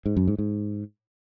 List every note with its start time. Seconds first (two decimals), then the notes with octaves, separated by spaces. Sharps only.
0.06 G#2
0.17 F#2
0.28 G#2
0.38 G#2